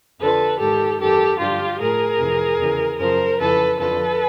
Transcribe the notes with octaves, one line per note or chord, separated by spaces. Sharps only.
F2 D3 F3 A4 B4
G#2 D#3 G4 A4
F#2 D#3 G4 A4
G2 D3 F3 F4 G4
A2 F3 G#4 A#4
F2 C3 E3
E2 C#3 E3
F#2 C#3 F3 A#4 C5
F2 C#3 E3 A4 B4
F2 D3 F3 A4 B4